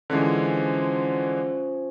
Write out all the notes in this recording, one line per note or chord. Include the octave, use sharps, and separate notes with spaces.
D3 E3 F3 G#3 C#4 C5